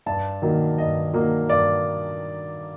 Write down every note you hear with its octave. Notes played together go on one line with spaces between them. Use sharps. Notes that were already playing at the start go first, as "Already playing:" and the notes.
G2 A5
D#3 F#3 A#3
G2 D#5
D#3 F#3 A#3
G2 D5